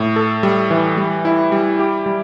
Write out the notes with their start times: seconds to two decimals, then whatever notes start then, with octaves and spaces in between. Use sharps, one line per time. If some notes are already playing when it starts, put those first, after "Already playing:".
Already playing: A2
0.16 A4
0.43 G3
0.71 E3
0.97 G3
1.25 E4
1.52 G3
1.79 G4
2.06 G3